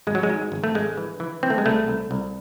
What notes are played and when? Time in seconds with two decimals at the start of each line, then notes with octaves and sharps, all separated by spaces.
0.07 G#1 G#3
0.15 F#3
0.23 G#3
0.30 G#2
0.52 G#1
0.64 A3
0.75 G#1 G#3
0.97 E3
1.20 E3
1.43 E3 C4
1.50 A3
1.58 G#3
1.65 C2 A3
1.88 C2
2.11 C2